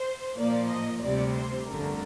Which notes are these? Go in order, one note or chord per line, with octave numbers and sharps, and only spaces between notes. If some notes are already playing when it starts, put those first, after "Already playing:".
Already playing: C5
A#2 F3 A#3 D5
D#5
D2 C3 G3 D5
C5
G1 F2 D3 A3 A#4